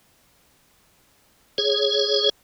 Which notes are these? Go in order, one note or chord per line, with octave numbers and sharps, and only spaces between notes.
G#4 C#5